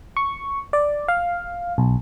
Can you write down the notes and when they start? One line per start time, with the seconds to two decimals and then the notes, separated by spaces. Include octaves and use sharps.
0.17 C#6
0.73 D5
1.08 F5
1.78 B1